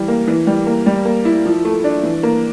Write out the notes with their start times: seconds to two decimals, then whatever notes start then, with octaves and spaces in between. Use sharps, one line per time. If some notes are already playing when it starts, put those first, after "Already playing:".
Already playing: E3 G3
0.08 A#3
0.28 E3
0.47 G3
0.67 A#3
0.86 G3
1.05 A#3
1.25 E4
1.45 F3
1.65 A3
1.84 D4
2.03 E3
2.23 A#3